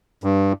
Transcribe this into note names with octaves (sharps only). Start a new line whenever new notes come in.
G2